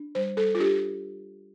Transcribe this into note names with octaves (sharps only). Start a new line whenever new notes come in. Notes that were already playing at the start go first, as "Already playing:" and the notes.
Already playing: D4
G3 C5
G3 A4
F4
D4 G4